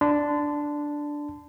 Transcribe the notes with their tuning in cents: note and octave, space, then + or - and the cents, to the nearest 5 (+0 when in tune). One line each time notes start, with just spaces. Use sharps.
D4 +0 A5 +0 C6 -35